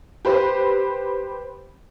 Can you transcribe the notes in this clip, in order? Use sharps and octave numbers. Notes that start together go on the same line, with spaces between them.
G4 B4 C5